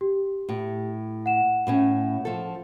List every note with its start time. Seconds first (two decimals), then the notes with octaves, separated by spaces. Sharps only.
0.01 G4
0.49 A2
1.26 F#5 E7
1.67 A2 A3 C#4
2.25 F3 A4